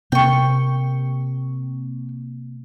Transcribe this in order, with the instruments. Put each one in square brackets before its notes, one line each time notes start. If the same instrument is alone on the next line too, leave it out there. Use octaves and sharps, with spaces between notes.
[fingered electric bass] C3 A#3 [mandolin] G5 C#6